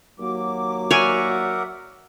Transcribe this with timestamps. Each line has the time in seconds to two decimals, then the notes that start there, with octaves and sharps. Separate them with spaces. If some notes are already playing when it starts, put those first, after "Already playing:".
0.19 D#2 F#3 A#3 D6
0.91 A#4 C#5 D5 E5 F#5 G#5